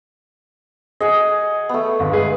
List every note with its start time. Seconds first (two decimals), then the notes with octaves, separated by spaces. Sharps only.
1.00 G#4 D#5 F#5 G#5
1.69 A3 B3
2.00 G1
2.13 G#3 G#4 B4